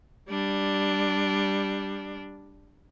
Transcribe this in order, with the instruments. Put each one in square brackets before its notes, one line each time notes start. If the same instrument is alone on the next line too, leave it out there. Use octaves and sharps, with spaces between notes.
[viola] G3 D4